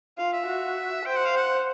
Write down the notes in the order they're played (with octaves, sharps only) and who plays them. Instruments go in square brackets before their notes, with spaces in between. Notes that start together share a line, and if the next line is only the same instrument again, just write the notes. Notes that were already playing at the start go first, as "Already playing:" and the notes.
[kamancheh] F4 [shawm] F5
[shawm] E5
[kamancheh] F#4
[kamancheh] C5 [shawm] G5
[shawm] F#5
F5
F#5